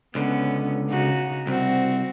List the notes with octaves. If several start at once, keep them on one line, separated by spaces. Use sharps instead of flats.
C#2 D3 B3 C#4
C#3 D#4 F#4
C2 C4 F#4